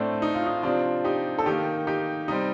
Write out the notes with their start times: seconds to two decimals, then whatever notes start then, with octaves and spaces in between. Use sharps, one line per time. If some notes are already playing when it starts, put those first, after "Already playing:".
Already playing: A2 A3 C4 D4
0.22 D#4
0.35 F4
0.47 D#4
0.63 C3 F3 C4 D4 F4
1.04 D#4 G4
1.39 A4
1.46 D#3 A#3 D#4 G4
1.87 D#4 G4
2.28 C3 G3 C4 D#4